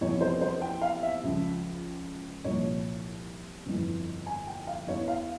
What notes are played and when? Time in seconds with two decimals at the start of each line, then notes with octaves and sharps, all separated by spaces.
0.01 E2 C3 F3 C#5
0.21 C5
0.41 C5
0.61 G5
0.81 F5
1.03 E5
1.23 C#2 C#3 F3
2.44 C2 A#2 F3 C#5
3.66 G1 F2 E3
4.26 G#5
4.47 G5
4.67 F5
4.87 E2 E3 C#5
5.08 F5